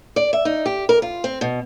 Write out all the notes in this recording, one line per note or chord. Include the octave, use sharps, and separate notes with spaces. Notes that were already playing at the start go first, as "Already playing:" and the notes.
D5
E5
D#4
G4
A#4
F4
C4
B2